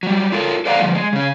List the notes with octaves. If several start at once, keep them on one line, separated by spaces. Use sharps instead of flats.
F#3 G3
F4 A4 A#4
A4 C5 D5 F5 F#5 A#5
D3 F3 G3
G#3
C#3 C#4